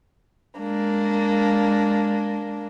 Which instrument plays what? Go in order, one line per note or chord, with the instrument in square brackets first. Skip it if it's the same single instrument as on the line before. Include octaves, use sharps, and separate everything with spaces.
[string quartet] G#3 A#3 D4